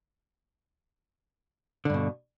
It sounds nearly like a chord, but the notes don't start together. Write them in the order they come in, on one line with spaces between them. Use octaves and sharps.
D3 G2 B2